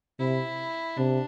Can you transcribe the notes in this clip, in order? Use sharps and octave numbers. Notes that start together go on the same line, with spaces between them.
C3 E4
C3 D4